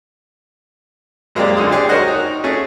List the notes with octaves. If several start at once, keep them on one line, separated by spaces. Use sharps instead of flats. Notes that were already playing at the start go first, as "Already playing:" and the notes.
F#2 G#3 A#3 C4 G4 D5
C#2 D3 C6 D#6
G4 G#4 D5
F#4 A#4 C5 C#5 D#5 F#5
D#4
A3 C#4 G#4